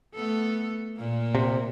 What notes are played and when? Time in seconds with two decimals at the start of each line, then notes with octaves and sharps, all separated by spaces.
0.14 A3 B3 A4
0.96 A#2 A#3
1.35 C3